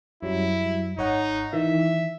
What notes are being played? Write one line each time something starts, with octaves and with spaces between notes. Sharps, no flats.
F#2 F#3 G3 E4
G#1 D#4 C#5 F#5
D#3 E3 E5